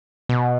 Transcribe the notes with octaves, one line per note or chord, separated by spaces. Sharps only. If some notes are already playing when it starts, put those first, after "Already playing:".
B2